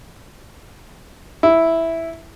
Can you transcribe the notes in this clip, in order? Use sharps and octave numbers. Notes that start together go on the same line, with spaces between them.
E4